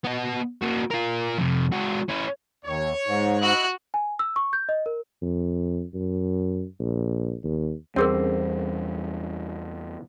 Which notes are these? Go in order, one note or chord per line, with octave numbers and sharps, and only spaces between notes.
B3 D#5
A#3 F#4
F4 A#4
F2 C3
G#3 F#4
C#4 E4
D#2 C#5
G#2
E4 F#4 D#5 F#6
G#5
E6
C#6
G6
D#5
A#4
F2
F#2
A#1
D#2
E2 G3 C4 C#4 G#4 A#4